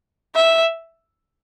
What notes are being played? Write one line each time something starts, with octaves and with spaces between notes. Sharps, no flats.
E5